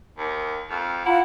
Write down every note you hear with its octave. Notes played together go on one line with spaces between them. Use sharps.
D#2
F2
E4 F4 F#5 A#5